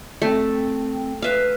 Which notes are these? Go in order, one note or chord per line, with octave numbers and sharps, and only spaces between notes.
A3 C4
B4 E5 F5